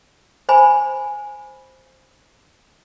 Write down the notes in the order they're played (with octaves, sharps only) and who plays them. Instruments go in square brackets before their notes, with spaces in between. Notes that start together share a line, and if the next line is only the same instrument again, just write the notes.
[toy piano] C5 G#5 B5